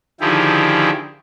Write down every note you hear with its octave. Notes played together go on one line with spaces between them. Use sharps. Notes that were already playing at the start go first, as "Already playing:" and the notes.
D3 D#3 F3 E4 G4 G#4